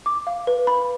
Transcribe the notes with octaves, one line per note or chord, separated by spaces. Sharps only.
D6
F5
B4
B5